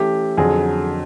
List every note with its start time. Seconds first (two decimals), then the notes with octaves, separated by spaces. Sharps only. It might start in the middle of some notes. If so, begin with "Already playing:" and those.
Already playing: E3 A3 C#4 G4
0.38 F2 D3 F#3 G#4